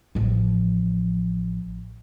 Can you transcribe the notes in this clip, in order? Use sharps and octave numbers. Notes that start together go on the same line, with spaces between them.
A1 F3